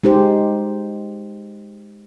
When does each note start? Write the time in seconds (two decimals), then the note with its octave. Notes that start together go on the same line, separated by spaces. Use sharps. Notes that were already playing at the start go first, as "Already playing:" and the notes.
0.03 G#3 D#4 G4 C5